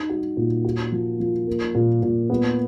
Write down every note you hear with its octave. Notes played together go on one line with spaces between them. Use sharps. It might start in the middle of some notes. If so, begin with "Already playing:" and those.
Already playing: D#4
F#4
A#2
F#4
F3
F3
A#3
A#2
A#2
B3